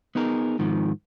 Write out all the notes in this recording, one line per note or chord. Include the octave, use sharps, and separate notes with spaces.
B3 D#4 G#4 A#4
G#2 D#3 F3